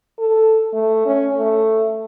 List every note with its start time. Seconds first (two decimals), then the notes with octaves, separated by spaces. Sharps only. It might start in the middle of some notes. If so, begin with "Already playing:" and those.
0.19 A4
0.73 A3
1.06 C#4
1.37 A3